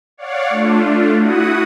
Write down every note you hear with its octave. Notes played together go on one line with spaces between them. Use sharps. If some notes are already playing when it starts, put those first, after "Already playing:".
C#5 D5 F5 F#5
A3 D4 F4
E4 F#4 F#5 D#6